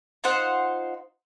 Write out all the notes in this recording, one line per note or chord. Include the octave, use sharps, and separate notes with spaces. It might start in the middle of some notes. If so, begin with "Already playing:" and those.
D#4 F4 C5 F#5